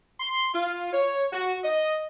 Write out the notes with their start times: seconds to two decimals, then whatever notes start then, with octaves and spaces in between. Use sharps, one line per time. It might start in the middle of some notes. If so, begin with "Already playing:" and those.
0.20 C6
0.53 F4
0.93 C#5
1.32 F#4
1.63 D#5